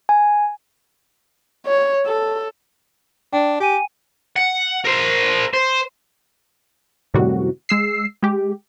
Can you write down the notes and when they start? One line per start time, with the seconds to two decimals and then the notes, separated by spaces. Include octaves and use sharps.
0.09 G#5
1.67 C#5
2.06 A4
3.33 D4 G5
3.60 G4 G5 G#5 D#7
4.36 F#5
4.85 A#4 C5
5.53 C5
7.14 F#2 A2 C3 D#3 G3 F#4
7.69 G#3 E6 C7
8.23 G#3 G4